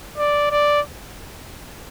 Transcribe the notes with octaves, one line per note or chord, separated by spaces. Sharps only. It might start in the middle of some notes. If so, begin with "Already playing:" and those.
D5
D5